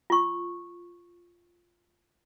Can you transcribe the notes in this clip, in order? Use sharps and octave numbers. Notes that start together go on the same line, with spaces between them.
F4 C#6